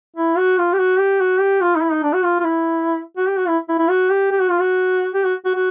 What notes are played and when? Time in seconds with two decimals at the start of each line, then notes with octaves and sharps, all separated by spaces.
0.17 E4
0.37 F#4
0.58 F4
0.73 G4
0.79 F#4
0.99 G4
1.21 F#4
1.40 G4
1.61 F4
1.76 D#4
1.82 E4
1.92 D#4
2.03 D4
2.13 F#4
2.24 F4
2.40 F4
2.44 E4
3.17 F#4
3.28 G4
3.37 F#4
3.48 E4
3.69 E4
3.79 E4
3.90 F#4
4.10 G4
4.31 G4
4.40 F#4
4.50 F4
4.60 F#4
5.14 G4
5.25 F#4
5.45 F#4
5.55 F#4